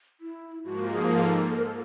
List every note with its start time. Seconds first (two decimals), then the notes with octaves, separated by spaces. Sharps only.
0.21 E4
0.64 G#2 F3 A#3 F#4
0.89 G4
0.92 G#4
1.21 A4
1.50 A4
1.57 A#4
1.65 A4